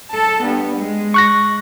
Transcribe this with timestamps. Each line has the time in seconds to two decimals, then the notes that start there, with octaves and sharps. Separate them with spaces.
0.11 A4 A5
0.43 G2 B3
0.78 G#3
1.14 C#6 F#6 A#6